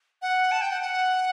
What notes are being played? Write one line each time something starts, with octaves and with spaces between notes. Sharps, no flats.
F#5
A5
G5
F#5
F#5